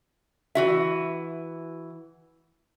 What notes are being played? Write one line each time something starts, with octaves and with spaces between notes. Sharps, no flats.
E3 F#4 E5